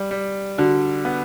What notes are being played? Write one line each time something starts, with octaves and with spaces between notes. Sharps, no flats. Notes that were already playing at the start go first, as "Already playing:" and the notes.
Already playing: G3
G3
D3 F#4
B3